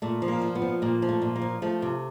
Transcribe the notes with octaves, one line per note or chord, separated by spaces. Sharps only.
A#2 A3
F3
A#3
A#2
B3
F3
A#2 A#3
F3
A3
A#2
A#3
F3
F3 A3
C3